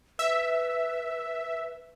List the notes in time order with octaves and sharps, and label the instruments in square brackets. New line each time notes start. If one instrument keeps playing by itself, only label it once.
[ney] B4 [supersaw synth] E5